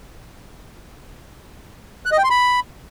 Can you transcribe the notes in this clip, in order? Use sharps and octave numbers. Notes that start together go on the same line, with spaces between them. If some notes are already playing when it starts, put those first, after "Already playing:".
F#6
D#5
G5
C6
B5